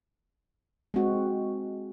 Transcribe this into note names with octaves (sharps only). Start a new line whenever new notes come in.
G#3 C4 F#4